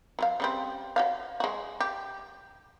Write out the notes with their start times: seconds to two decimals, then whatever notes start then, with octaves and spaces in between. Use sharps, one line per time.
0.19 F#3 G#4 F5
0.40 C#3 G3 C4
0.96 F#4 C#5 F5
1.40 G#3 F#4
1.80 G4